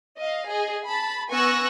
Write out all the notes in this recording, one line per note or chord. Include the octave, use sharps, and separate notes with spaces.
D#5 F5
G#4 D#5
A5 B5
B3 G#5 C#6 E6 F#6 A#6